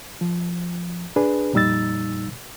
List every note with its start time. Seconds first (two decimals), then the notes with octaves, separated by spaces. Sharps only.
0.21 F3
1.16 D4 G#4 B4
1.53 F2 A#2 G3 D#4 E6 A6